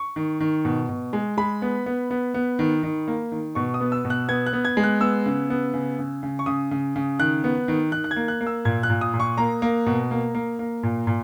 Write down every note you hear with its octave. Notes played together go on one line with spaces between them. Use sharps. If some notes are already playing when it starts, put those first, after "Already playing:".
Already playing: C#6
D#3
D#3
B2
B2
G#3
G#3 B5
B3
B3
B3
B3
D#3
D#3
A#3
D#3
B2 C#6
D#6
B3
E6
B2
F#6
B3 G#6
F#6
B3
G#6
G#3
F#6
B3 E6
C#3
B3
C#3
C#3
C#3
C#6
C#3 D#6
C#3
C#3
D#3 F#6
B3
D#3
D#3 F#6
F#6
G#6
A#3
F#6
A#3
E6
A#2 G#6
F#6
A#2
D#6
A#2
C#6
A#3 A#5
A#3
B2
A#3
A#3
A#3
A#2
A#2